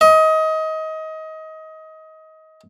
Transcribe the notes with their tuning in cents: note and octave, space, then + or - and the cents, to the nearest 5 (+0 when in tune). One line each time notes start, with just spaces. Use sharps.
D#5 +25